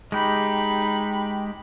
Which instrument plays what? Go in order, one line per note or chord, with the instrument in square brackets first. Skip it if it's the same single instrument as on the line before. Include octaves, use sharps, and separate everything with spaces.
[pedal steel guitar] G#3 G4 [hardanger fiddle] D#4 B5